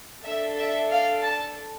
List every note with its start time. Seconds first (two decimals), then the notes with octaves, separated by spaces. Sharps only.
0.24 D4 A4 E5
0.57 E5
0.90 F5
1.22 A5